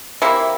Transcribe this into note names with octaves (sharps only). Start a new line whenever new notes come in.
C3 F3 A#3 E4